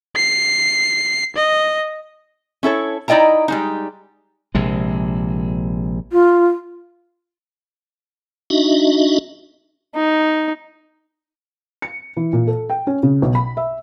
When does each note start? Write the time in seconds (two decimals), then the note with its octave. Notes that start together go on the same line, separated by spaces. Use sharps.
0.16 C7
1.36 D#5
2.63 C#4 E4 A4 C#5
3.08 D#4 E4 D5 D#5 G5 A#5
3.48 G3 G#3 D#4
4.55 A#1 C3 G#3
6.12 F4
8.50 D4 D#4 F#4 D#5 E5
9.95 D#4
11.82 C#7
12.17 E3
12.33 A#2
12.47 A4
12.70 G5
12.87 C#4
13.03 C#3
13.22 B1
13.35 B5
13.57 E5